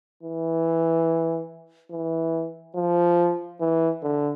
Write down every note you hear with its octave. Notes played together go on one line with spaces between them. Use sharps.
E3
E3
F3
E3
D3